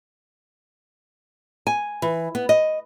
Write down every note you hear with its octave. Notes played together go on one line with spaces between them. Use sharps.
G#5
E3
B3
D#5